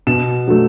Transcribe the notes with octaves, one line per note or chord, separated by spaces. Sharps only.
B2 E7
F#3 A3